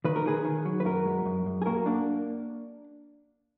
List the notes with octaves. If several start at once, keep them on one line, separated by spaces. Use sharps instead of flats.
D#3 B4
A#4
D#3 G#4 B4
D#3
F#3
B4
F#2 F#4 A#4
G#3
F#2
F#2
G#4
A#3 F#4 A#4
A#3 D4